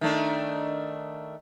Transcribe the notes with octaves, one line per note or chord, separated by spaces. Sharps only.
D#3 A3 D4